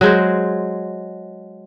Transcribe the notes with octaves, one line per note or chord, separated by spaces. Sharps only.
F#3 G#3 C5